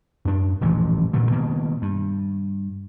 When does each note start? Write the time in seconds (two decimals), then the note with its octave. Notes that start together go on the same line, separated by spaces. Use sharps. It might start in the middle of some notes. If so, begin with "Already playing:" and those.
0.25 F#2 D4
0.61 D#1 A1 E3 F3
1.13 G2 A#2 D3
1.32 B2 D#3 A#3
1.82 G2